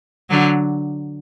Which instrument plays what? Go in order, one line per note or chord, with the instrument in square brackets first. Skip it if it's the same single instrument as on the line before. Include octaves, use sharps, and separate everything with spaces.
[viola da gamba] D3 F#3